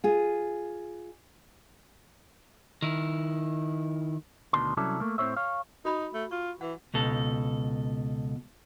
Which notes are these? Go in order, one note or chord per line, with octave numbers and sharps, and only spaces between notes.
F4 G#4
D#3 E4
D2 B2 D#3 D4 C6
C2 F#3 C#4 E4 A4 D5
A3 A#3
A2 C4 E4 C5 C#5 E5
C#5 F5
D#4 F#4 B5 D#6
A3
F4 C#6
E3 F#5
C#2 B2 A4